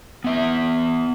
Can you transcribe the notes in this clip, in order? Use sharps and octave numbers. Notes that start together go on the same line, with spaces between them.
B3 E5